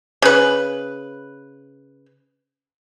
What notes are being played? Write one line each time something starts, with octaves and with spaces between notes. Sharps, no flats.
C#3 B4